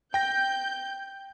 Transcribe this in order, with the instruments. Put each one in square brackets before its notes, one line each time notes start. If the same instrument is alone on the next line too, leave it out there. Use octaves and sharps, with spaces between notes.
[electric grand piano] G5 A#6 [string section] G6